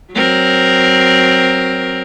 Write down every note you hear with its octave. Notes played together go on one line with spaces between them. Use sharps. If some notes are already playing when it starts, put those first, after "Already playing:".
F#3 C4 A#4